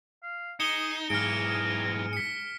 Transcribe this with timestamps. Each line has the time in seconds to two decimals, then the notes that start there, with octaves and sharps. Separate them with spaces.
0.23 F5
0.60 D#4 G#4 C#7 E7 G7
1.10 B1 G#2 E3 G#4 G#5 A#5 F6 D7
2.13 B6 C#7